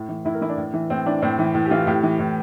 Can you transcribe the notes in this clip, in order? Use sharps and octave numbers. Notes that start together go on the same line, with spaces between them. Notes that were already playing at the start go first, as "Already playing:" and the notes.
Already playing: A2
E3
A2 E4
A#4
E3 E4
D4
A2
E3
A2 C4
E3 D4
A2 C4
E3
A2
G4
E3 F4
A2 G4
E3
A2